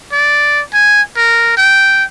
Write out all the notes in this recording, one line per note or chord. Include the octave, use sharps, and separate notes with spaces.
D5
G#5
A#4
G5